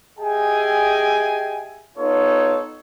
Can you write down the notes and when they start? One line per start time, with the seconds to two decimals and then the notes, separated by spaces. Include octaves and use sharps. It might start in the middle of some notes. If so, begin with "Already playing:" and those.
0.19 G4 G#4 D#5 E5 G5 G#5
1.97 B3 D#4 F4 A4 C#5